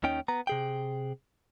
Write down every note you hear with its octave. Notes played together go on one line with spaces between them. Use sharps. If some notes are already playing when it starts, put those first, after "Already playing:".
D#2 D#3 C#4 D#4 G5
B3 A#5
C3 G#4 G5